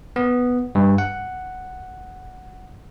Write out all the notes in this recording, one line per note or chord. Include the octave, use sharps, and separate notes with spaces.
B3
G2
F#5